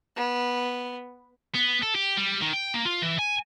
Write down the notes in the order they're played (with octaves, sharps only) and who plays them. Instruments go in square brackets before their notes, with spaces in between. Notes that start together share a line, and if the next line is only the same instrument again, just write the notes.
[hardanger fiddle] B3
[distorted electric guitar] B3
A4
G4
G3
D#3
G5
A#3
F4
E3
G#5